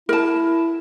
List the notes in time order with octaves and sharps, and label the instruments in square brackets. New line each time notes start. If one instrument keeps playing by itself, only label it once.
[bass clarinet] E4 [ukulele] A#4 A5